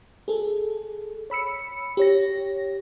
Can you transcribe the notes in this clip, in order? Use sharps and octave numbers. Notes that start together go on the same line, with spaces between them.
G#4 A4
C#5 B5 E6 C#7
G4 C#5 A#6